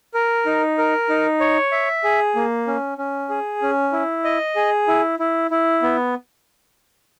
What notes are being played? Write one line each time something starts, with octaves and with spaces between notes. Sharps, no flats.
A#4
D#4
A#4
D#4
C#5
E5
G#4
A#3
C#4
C#4
G#4
C#4
E4
D#5
G#4
E4
E4
E4
B3